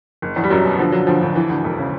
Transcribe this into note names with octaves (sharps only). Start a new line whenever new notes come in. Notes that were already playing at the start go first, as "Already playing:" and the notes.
F#1
E2
G3
F#1 F#2 F#3
B2
D3 F3
D3 F#3
D2 F3
D2
E3
D2
E1
C#3